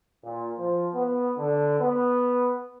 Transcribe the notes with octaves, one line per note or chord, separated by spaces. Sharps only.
A#2
F3
B3
D3
B3